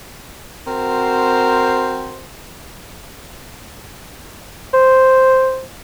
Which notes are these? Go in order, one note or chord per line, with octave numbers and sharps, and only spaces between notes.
C4 F#4 A#4 C5
C5